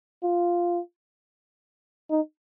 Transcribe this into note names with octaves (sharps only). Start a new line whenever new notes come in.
F4
D#4